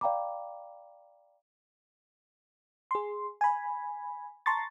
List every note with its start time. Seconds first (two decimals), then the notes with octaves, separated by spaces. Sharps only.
0.01 D5 F5 G5 A#5 B5 D6
2.91 G#4 C6
3.41 G#5 B5
4.46 A5 A#5 C6 C#6 A6